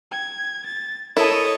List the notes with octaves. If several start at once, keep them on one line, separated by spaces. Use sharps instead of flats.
G5 G#6
A6
E4 A4 A#4 C#5 D#5 A5 D#6